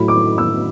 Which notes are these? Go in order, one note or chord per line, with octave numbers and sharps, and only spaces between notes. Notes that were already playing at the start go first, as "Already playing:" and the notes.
Already playing: A2 F#3 A3 E4 B5
D6
E6